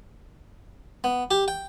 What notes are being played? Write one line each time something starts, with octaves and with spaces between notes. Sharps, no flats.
B3
G4
G5